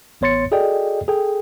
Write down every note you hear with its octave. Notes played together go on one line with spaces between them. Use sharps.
A1 B3 C#5 C6 A6 C#7
F#4 G#4 A4 D5 D#5 G5
G#4 A4 G5